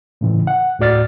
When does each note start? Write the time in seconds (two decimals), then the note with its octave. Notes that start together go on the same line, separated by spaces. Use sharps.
0.21 A2 C#3 E3
0.47 F#5
0.79 D2 A2 F#4 D5 F6 A6